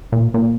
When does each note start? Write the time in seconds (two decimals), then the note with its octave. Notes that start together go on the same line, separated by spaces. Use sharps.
0.12 A#2
0.34 A#2